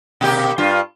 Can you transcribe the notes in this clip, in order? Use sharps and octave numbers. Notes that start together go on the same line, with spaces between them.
B2 A#3 G4
G2 F4